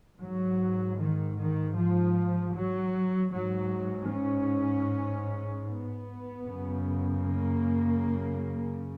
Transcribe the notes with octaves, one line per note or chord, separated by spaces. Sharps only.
G#2 F#3
D#3
D#3
F3
F#3
G#2 F#3
C#4
B3
F#2 C#3
A#3